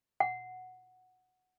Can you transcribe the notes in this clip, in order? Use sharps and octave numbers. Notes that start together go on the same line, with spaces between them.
F#5